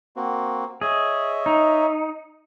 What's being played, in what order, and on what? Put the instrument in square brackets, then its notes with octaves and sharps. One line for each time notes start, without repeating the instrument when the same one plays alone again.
[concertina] A#3 C4 F#4
[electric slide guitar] G#4 [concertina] C#5 D#5 E5
[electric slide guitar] D#4